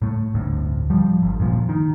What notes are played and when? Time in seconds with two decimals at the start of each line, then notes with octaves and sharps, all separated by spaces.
0.02 A2 A3
0.34 G1 D2 A2
0.90 F3 G3
1.22 G1
1.40 F#2 A#2 F3
1.69 D#3